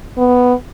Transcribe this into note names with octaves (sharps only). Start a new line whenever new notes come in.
B3